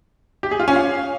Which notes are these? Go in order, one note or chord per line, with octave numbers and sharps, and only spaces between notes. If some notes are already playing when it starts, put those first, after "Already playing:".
G4
G#4
F4
C#4
F5